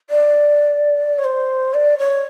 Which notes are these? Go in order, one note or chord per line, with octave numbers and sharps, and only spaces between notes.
D5
C#5
C5
D5
C#5